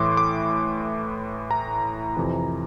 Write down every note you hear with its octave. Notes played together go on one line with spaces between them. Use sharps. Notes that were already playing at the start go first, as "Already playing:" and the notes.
Already playing: A2 E3 C6 D6
D6
A#5
F2 C3 E3